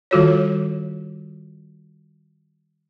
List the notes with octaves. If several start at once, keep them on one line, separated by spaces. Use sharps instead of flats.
D#3 G3 F4 F#4 A4 C#5